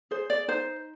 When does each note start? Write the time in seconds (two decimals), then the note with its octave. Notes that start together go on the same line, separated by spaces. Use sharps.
0.11 G#4 C5
0.30 D5
0.48 D#4 C5